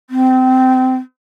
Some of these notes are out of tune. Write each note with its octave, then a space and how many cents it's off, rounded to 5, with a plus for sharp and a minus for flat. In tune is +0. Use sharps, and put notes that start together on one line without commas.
C4 -25